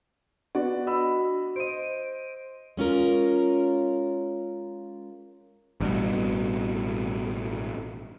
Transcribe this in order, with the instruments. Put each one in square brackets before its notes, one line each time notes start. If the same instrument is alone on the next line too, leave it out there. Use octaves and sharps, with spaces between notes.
[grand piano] B3 D5 [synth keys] D4 F#4
[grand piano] D#5 B5 E6
[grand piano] C5 D#5 [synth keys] D7 D#7
[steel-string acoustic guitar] G#3 C#4 F4 A#4
[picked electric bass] A1 G2 B2